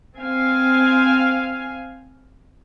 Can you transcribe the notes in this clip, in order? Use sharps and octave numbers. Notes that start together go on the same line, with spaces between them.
C4 F5 G#5